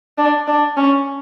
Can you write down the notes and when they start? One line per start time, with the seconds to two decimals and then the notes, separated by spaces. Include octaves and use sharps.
0.18 D4
0.47 D4
0.77 C#4